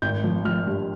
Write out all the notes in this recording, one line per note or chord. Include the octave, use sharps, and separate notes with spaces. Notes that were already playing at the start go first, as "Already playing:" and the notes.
G#1 G6
F3
F3 F6
G2